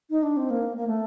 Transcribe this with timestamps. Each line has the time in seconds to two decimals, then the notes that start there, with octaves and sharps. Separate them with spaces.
0.10 D#4
0.23 D4
0.37 C4
0.50 A#3
0.77 A#3
0.87 A3